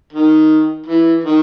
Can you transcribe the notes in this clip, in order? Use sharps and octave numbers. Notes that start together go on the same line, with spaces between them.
D#3
E3
D#3